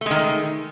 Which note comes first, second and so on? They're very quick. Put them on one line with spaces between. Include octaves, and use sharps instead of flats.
A3 G#3 D#3